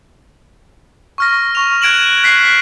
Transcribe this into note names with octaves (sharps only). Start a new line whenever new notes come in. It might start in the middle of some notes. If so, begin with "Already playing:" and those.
C#6 F6 A#6
C#6 F7
F#6 G#6 D7 E7 F#7
F#6 B6 C7